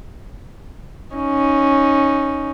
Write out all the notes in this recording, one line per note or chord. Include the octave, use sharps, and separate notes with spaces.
C#4 D#4